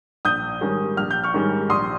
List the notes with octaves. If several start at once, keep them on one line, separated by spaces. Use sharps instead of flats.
A#1 D#6 G6
G#2 D#3 G3 C#4
A#1 F6
G6
C#6 F6
G#2 D#3 G3 C#4
A#1 C6 D#6